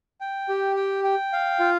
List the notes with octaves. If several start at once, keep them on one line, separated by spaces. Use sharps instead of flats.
G5
G4
G5
G5
F5
F4